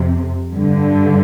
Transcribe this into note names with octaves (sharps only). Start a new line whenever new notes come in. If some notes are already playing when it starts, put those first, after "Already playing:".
Already playing: F2 C3
G2 D3